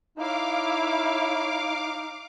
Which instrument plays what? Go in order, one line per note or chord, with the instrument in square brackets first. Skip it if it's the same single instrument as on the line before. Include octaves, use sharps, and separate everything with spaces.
[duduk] D#4 [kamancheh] E4 C#5 [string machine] F5 D6